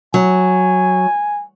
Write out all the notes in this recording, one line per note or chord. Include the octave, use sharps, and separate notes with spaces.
F#3 G#5